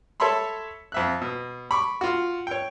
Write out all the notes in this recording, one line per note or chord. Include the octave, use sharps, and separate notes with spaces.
A4 C#5 E5 A5 B5 C6
F2 E5 F#6
B2
B5 C#6 D6
F4 F#4
C#5 G5